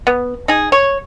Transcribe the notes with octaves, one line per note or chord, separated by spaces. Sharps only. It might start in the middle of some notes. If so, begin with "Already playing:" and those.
B3
D#4 G#4
C#5